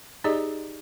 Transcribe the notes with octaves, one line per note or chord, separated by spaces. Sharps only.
D#4 G4 G#4 D5 D#5